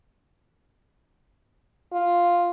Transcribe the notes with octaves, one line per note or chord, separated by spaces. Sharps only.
F4